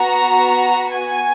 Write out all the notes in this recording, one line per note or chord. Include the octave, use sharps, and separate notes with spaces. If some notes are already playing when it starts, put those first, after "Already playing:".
Already playing: B3 F#4 A#5
G#5